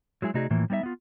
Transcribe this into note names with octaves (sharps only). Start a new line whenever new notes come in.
F#3 G#3 E4 G#4
C3 A3 D#4 F#4 G#4 D5
A2 E3 F3 A#3
G3 B3 D#4 C#5 E5
B3 F4